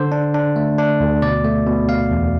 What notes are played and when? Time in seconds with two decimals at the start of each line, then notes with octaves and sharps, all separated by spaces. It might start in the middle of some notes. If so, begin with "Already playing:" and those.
Already playing: D3 C5
0.12 D4
0.34 D4
0.56 A3
0.79 D4
1.00 D2
1.22 B2 D5
1.45 A3
1.67 B2
1.89 B2 F5
2.11 E2